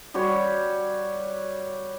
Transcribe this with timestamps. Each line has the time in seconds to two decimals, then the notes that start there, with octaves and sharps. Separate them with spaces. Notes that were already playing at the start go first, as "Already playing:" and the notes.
0.14 G3 F#4 G4 C#5